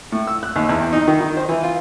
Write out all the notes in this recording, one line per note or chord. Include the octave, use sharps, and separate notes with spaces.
A2
E6
F#6
D#2
E2
D#4
D#3
D#3
C5
E3
F4